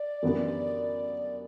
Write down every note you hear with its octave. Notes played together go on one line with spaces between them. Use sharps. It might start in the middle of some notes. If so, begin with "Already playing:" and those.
Already playing: D5
F#2 E3 B3 D4 G4